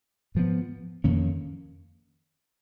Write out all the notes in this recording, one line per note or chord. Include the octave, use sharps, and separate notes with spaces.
G#2 F3 B3
F2 D#3 A#3 C#4